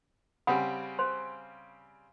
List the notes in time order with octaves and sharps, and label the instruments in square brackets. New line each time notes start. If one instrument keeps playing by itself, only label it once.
[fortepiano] C#3 G3 C4 [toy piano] F#5 B5 D#6
[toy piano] C5 C6